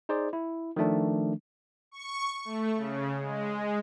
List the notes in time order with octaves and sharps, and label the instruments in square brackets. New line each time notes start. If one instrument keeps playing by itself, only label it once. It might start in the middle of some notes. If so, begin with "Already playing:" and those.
[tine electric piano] D#4 G#4 C5 D5
E4
D#3 F3 A3 D4
[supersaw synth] C#6
A3
C#3
G#3